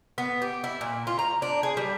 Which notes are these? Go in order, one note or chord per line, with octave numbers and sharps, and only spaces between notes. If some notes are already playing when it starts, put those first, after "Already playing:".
B3
G4
E4
A#2
F4
A#5
D4
G#4
G3